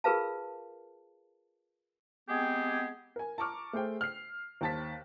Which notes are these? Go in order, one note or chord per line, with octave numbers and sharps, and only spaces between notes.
F4 G#4 A#4 B4 F5 A5
G#3 B3 C4 G4 G#4
A#4 G#5
A5 A#5 C#6 D6 F6
A3 G#4 C5 G5
F6 C7
D#2 C5 A5 A6 B6